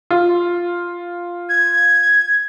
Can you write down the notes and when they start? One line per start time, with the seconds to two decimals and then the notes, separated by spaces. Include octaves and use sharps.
0.10 F4
1.49 G#6